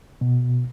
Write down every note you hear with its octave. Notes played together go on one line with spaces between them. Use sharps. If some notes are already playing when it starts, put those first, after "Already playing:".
B2